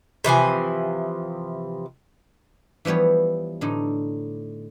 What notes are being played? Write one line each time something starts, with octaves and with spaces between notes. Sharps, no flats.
C3 E3 F3 G#5
E3 F3 G3 B3 C#5
A2 D3 D#4